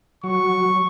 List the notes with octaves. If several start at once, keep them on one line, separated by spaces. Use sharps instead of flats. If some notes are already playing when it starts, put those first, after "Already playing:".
F#3 C#6